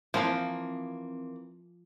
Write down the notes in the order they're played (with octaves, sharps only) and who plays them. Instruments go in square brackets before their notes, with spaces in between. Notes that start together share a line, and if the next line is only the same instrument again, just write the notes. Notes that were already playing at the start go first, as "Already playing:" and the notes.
[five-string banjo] E3 G#3 A#3 [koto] F3 [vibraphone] C4